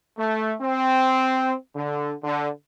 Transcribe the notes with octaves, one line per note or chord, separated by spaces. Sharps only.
A3
C4
D3
D3